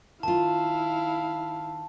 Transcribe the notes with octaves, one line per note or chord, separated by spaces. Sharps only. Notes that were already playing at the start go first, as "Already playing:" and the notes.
D#3 E4 F4 F5 A5